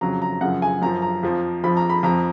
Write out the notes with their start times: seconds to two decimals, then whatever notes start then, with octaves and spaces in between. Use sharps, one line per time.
0.01 F2 C#3 F#3 A#5
0.22 A#5
0.41 F#2 C#3 F3 F#5
0.62 G#5
0.82 F#2 F3 A#5
1.02 A#5
1.23 F2 F3
1.64 F2 F3 B5
1.77 A#5
1.90 B5
2.03 F2 F3 A#5